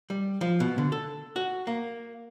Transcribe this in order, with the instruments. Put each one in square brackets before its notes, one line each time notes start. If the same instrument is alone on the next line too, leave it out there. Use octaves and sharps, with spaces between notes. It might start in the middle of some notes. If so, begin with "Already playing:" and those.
[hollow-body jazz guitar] G3
F3
B2
D3
A4
F#4
A#3